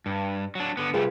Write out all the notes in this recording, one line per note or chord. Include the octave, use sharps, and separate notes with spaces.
G2
F#3 D4
D3 B3
C3 G3 A3 F4 G#4 B4